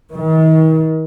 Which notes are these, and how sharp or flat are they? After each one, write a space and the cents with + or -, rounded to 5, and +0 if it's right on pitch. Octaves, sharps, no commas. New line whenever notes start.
D#3 +40